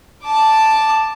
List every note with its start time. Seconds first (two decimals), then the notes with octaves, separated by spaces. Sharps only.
0.24 A5 D6